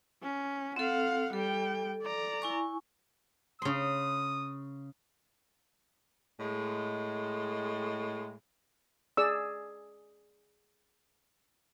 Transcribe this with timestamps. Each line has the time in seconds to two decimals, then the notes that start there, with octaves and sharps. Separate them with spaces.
0.23 C#4
0.76 C4 A4 F5 F#5
1.33 G3 A4 G5
2.02 D5 A#5
2.42 E4 G#5 C#6
3.62 C#3 C6 D#6
6.40 A2 G#3
9.17 G#4 D5 E6